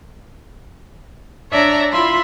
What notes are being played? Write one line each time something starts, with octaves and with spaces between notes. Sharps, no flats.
D4 C#5 D5 E5 A5 A#5
E4 F4 E5 B5 C6